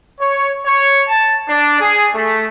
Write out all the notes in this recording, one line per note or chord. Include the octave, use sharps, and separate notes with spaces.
C#5
C#5
A5
D4
G#4
A3